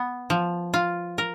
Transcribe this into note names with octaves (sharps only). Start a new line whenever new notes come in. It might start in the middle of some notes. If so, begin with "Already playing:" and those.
Already playing: B3
F3
F4
A#4